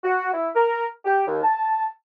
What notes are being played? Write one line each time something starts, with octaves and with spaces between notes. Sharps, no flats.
F#4
E4
A#4
G4
D#2
A5